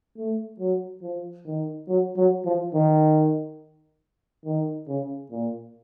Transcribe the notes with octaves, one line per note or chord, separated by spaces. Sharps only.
A3
F#3
F3
D#3
F#3
F#3
F3
D#3
D#3
C#3
A#2